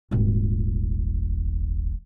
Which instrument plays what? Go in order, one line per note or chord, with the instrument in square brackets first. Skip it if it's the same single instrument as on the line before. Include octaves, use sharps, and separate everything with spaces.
[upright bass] D#1 G#1